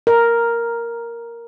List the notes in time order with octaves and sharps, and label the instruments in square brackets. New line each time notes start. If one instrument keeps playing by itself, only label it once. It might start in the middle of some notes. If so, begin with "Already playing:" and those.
[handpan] A#4